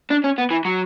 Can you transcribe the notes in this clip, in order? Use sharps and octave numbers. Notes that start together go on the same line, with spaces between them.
D4
C#4
B3
E3
F#3